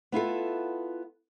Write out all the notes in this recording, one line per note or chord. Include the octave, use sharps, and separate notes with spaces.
B3 E4 F4 A4